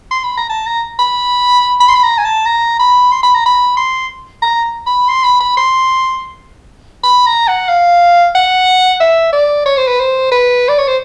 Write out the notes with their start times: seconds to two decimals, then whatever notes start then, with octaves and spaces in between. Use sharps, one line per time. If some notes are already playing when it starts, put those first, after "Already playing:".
0.11 C6
0.24 B5
0.37 A#5
0.50 A5
0.66 A#5
0.99 B5
1.80 B5
1.89 C6
1.95 B5
2.03 A#5
2.18 G#5
2.25 A5
2.46 A#5
2.80 B5
3.12 C6
3.23 B5
3.35 A#5
3.46 B5
3.77 C6
4.42 A#5
4.86 B5
5.08 C6
5.24 B5
5.40 B5
5.57 C6
7.04 B5
7.27 A#5
7.48 F#5
7.69 F5
8.35 F#5
9.01 E5
9.33 D5
9.66 C#5
9.77 C5
9.88 B4
10.00 C5
10.32 B4
10.68 D5
10.78 C#5
10.88 C5